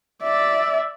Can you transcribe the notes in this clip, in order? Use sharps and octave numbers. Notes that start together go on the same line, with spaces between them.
D5 E5